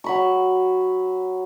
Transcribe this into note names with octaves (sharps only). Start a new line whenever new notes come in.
F#3 B5 C#6